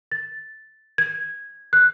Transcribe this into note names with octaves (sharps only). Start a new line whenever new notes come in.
A6
G#6
F#6